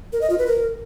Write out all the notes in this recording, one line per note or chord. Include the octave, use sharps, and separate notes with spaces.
A#4
D#5
F4
B4
A#4